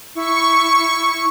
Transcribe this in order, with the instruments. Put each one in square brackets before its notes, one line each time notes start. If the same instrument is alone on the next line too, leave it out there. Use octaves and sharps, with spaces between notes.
[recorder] E4 [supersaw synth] C#6